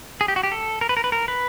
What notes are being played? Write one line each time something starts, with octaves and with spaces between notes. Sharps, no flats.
G#4
G4
F#4
G4
A4
A#4
B4
A#4
B4
A#4
B4